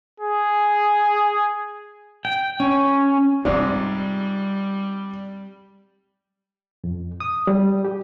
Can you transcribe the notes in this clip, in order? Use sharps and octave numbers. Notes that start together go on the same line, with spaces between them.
G#4
G5
C#4
G#2 C3 G3 D#4 F4 D5
F2
D#6
G3
G4